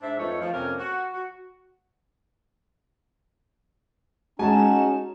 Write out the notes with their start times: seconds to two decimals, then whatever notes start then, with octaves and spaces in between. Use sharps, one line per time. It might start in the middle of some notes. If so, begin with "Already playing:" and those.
0.02 G#2 D4 C5 E5
0.18 F2 F3 A3 D#4 B4 C#5
0.40 F3
0.53 F2 C3 A#3 C#4 A#4
0.77 F#4
1.12 F#4
4.39 G#3 C#4 D#4 F#4 G#5 A5 E7